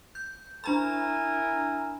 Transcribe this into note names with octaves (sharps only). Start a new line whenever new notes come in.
G6
D4 E4 A#4 G#5 A#5 B5